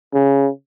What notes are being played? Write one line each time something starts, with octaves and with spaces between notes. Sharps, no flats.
C#3